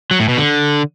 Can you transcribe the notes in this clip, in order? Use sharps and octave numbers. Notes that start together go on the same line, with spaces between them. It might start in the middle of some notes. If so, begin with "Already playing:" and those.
F#3
A2
B2
D3